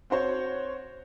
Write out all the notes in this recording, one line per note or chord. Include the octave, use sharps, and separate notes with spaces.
C4 F#4 C5 C#5